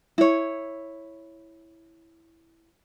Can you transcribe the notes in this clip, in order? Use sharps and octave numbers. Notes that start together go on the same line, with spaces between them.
E4 C#5